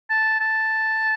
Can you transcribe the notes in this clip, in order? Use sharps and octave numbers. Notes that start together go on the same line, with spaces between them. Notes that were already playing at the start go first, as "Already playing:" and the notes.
A5
A5